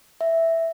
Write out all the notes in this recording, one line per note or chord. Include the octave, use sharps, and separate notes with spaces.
E5